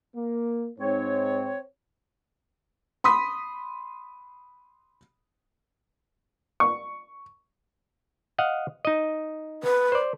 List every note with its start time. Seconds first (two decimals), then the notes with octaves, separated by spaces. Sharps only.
0.16 A#3
0.79 G#2 C4 C#5
3.04 B5 C6 D#6 B6
6.60 C#6
8.38 D#5 F5 F#5
8.85 D#4 D#5
9.63 B4
9.92 C5 D5